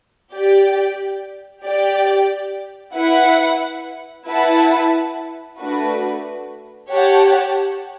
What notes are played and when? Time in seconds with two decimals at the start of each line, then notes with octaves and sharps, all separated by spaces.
0.32 G4 D5 G5
1.64 G4 D5 G5
2.95 E4 B4 F#5
4.26 E4 B4 F#5 A5
5.58 A3 D4 F#4 B4
6.89 G4 C#5 F#5 A5